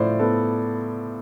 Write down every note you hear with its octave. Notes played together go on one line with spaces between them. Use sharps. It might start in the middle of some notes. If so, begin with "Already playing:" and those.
Already playing: A2 F3 C5 D5
B3 A4